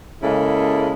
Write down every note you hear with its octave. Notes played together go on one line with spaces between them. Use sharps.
C#3 G#3 A#3 E4 A4